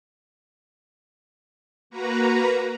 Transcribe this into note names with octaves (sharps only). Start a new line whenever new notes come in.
A#3 F#4 B4 A#5